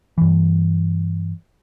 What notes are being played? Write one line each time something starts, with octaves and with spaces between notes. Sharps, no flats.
G2 E3